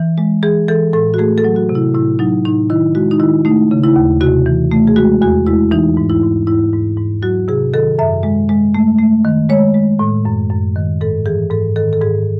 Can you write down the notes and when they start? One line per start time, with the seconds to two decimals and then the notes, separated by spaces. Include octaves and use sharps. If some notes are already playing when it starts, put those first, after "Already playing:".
Already playing: E3
0.18 G#3
0.43 E3 G#4
0.68 E3 A4
0.93 A2 A4
1.14 F#4
1.18 A3 G#4
1.38 A4
1.44 F#3
1.56 F#4
1.69 C3
1.75 E4
1.94 A2 E4
2.19 F#3 D#4
2.45 A2 D#4
2.70 D#3 E4
2.95 G#3 F#4
3.11 D#4
3.20 D#3 E4
3.45 A3 D#4
3.71 C#3
3.84 E4
3.96 D#2
4.21 C3 F#4
4.46 E3
4.71 A3
4.87 G#4
4.96 G#3 F#4
5.21 E2 F#4
5.47 G#3 E4
5.71 E3 D#4
5.97 G#2
6.10 E4
6.23 G#2
6.47 G#2 E4
6.73 G#2
6.97 G#2
7.22 F#3 F#4
7.48 C3 G#4
7.74 D#3 A4
7.99 F#2 E5
8.23 G#3
8.49 G#3
8.75 A3
8.99 A3
9.25 D#3
9.49 G#3 C#5
9.74 G#3
9.99 A2
10.25 F#2
10.51 F#2
10.76 D#3
11.01 G#2 A4
11.26 E3 G#4
11.50 G#2 A4
11.76 D#3 A4
11.93 A4
12.01 G#2 G#4